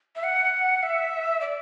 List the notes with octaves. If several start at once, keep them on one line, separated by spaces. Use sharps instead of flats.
E5
F#5
E5
D5